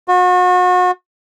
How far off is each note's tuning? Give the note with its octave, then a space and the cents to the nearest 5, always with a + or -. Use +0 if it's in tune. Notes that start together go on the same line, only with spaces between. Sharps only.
F#4 -35